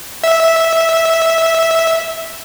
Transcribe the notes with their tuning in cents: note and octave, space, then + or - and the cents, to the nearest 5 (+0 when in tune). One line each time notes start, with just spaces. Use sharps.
E5 -10